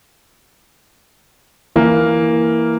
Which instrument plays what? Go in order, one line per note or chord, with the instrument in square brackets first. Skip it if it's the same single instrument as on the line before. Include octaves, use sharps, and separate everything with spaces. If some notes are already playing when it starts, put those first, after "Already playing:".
[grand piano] E3 A#3